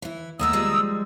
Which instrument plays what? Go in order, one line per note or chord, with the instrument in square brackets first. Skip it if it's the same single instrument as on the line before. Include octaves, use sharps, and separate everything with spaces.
[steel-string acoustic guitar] E3 E4
[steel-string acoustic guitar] D#2 A3 B3 [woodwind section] A#5 D#6 E6
[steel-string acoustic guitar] F3 G3 G#3